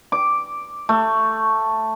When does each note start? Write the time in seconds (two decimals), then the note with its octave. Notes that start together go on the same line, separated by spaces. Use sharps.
0.12 D6
0.89 A3